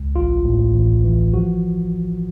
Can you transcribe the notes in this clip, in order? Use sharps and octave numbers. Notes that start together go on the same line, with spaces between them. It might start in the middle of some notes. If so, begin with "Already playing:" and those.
Already playing: C#2
A1 F4
A2
A1
E3
F3 F#4